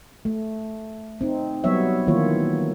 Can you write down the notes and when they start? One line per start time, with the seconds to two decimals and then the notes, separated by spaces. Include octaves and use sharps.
0.25 A3
1.21 C4 D#4
1.64 F#3 G3 B3 C#5 E5
2.07 D#3 E3 A#3 F4 C#5